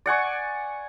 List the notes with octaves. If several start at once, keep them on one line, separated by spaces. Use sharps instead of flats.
D5 F#5 G#5 C#6